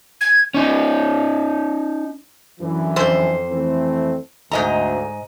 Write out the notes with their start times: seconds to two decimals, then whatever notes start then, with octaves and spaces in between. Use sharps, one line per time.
0.21 G#6
0.54 C#4 D#4
2.61 F#2 D3 E3
2.96 F2 C5
3.51 E3 A3 C4
4.52 D2 G#2 D#5 A#5